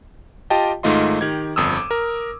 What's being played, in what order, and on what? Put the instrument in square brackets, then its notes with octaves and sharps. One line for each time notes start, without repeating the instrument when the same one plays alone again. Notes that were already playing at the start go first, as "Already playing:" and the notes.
[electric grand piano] F4 G4 D#5 G5 A5
G#2 D#3 A3 F4 D#5 C6
D#3 G4 G#6
G1 F2 D#6 E6
D6
A#4